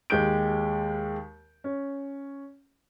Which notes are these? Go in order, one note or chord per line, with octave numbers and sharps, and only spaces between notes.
D#2 G#3 G4 G6 D7
C#4